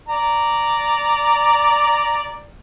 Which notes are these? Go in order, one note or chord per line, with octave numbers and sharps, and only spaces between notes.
D5 A#5